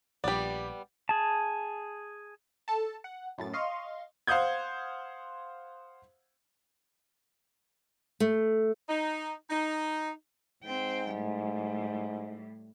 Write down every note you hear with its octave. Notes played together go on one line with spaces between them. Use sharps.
A#1 G3 B3 G4 D5
G#4 A5
A4 A5
F#5
F#2 A2 A6
D#5 F5 C6 C#6
C5 F5 F#5 D#6 G6 G#6
A3
D#4
D#4
G#2 C4 G5
A2 G3